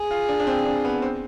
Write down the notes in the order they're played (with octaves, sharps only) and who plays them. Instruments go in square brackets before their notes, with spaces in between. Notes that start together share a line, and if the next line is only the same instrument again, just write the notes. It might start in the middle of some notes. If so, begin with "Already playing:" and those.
Already playing: [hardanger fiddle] G#4
[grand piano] F4
D4
D4
C4
D4
B3
C4